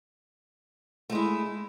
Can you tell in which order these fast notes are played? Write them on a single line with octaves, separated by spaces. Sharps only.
A3 G#3 E4